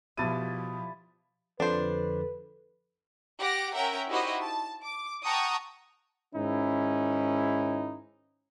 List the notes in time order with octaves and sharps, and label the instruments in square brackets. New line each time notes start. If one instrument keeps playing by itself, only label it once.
[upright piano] B2 D#7 [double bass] F3 [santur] G3 A5 [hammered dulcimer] E4
[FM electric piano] F2 D3 F3 [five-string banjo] D4 C5 [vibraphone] A4 [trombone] B4
[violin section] G4 F#5 A#6 D7
C#4 A#4 E5 F#5 G5
D#4 E4 F#4 G4 C5 D#5
A5
D6
F#5 G5 A5 A#5 C#6 D#6
[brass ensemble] G#2 D#3 C#4 D#4 E4